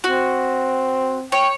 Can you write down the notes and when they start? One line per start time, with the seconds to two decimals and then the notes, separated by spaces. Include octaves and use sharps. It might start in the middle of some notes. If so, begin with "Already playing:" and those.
0.04 C4 F#4
1.32 C#5 G5